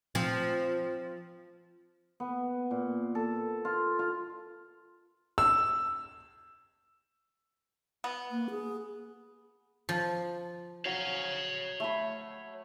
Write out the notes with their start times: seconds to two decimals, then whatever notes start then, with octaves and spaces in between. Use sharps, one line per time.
0.15 F3 C4
2.20 B3
2.71 A#2
3.15 A4
3.65 F4
3.99 F4
5.38 E6
8.04 B3
8.31 A#3
8.50 G#4
9.89 F3
10.85 F#3 C#5 F5
11.80 A3 B5